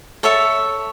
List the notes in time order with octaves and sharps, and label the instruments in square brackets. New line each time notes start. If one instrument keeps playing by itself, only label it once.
[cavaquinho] A4 C#5 E5 A5